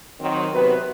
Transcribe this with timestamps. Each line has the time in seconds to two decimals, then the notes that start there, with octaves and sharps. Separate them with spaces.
0.20 D#3 F#3 C4
0.50 C3 F#3 B3 F#4 B4